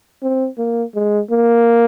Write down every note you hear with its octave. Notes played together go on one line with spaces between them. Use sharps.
C4
A#3
G#3
A#3